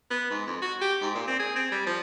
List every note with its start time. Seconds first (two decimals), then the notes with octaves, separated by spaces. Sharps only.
0.11 B3
0.31 G#2
0.47 F2
0.62 F#4
0.81 G4
1.01 G#2
1.15 A#2
1.27 C4
1.39 G#4
1.56 C4
1.72 G3
1.87 F3